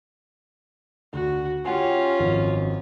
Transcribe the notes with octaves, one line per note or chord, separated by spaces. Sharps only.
D2 F#4
C#4 F4 G4 F#5 G#5
G#1 F#2 F3